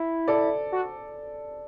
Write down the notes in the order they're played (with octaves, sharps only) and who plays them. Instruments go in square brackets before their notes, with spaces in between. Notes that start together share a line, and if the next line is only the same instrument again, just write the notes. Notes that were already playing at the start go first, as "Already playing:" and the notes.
Already playing: [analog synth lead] E4
[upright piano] A4 D5
[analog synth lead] F#4